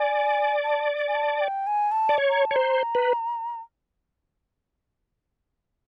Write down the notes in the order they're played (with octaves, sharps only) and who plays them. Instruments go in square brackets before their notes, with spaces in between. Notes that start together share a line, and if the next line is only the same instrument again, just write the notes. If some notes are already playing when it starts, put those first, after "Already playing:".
Already playing: [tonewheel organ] D5 [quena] G#5
[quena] A5
G#5
A5
G5
G#5
A5
[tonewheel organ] D5
C#5
[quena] A#5
A5
[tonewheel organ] C#5
[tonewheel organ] C5 [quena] A#5
[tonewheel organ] B4